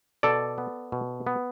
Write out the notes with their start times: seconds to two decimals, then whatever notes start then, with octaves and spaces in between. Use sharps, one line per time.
0.23 B2 A4 D5
0.58 B3
0.92 B2
1.27 B3